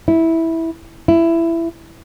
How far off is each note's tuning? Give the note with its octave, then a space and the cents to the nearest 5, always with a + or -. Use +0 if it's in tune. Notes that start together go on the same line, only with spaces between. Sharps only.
E4 -10
E4 +15